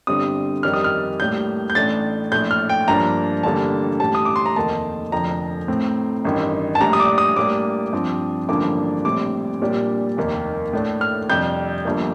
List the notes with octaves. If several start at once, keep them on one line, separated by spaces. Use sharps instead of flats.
G1 G2 D3 G3 C4 D#6
F2 D#3 G3 D4 F6
D#6
F6
A2 G3 A#3 D4 G6
G6
A1 A2 A3 D4 A6
A#1 A2 A3 G6
F6
G5
G2 F3 A#3 D4 A#5
A1 G2 D3 G3 A#3 A5
A1 A2 G3 A5
D#6
D6
C6
A#5
F1 D#2 D#3 A3 A5
F1 F2 D3 F3 A#5
A2 A3 C4
A1 G2 D#3
A5
A#1 A2 G3 D4 A#5
D#6
D6
D#6
A2 G3 A#3 D4 D6
G2 F3 C4
A1 G2 D3 F3 A#3 D6
A#1 A2 G3 C4 D6
A#1 A#2 G3 D4
F1 D#2 D#3 A#3
A2 A3 D4
F6
F2 C3 G3 D4 G6
G1 G2 F3 A#3